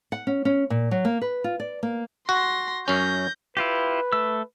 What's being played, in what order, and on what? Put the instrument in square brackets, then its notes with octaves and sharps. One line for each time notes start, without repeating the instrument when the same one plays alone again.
[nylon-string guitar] F#5
C#4
C#4
A#2
F#3
A#3
B4
F4
D5
A#3
[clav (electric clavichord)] F#4 [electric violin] C6 A#6
[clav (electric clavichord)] F#2 C#4 [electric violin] G6 A#6
[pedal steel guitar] E4 F4 G4 [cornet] B4
[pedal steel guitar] A3 E6